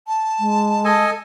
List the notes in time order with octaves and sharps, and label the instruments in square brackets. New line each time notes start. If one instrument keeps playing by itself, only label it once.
[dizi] A5
[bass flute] G#3
[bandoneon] A4 D#5 G#5